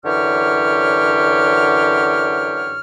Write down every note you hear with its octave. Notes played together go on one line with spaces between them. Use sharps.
F#2 D3 E3 G4 C#5 F6